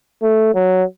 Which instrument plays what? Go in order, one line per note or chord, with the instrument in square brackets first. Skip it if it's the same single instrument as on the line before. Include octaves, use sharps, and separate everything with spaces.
[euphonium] A3
F#3